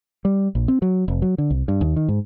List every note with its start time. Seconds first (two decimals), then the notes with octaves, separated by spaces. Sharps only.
0.25 G3
0.55 A#1
0.68 C4
0.82 F#3
1.08 F1
1.22 F#3
1.38 D3
1.50 C2
1.68 G2
1.81 D#2
1.96 D#3
2.08 G#2